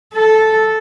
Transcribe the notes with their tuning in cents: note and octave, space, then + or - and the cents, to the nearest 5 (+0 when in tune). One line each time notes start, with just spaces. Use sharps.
A4 -10